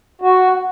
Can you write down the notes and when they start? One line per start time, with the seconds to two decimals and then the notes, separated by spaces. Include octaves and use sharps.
0.22 F#4